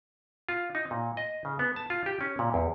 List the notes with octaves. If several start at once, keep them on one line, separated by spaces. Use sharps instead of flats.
F4
D#4
A#2
D#5
C#3
B3
A5
F4
G4
C#4
A#2
E2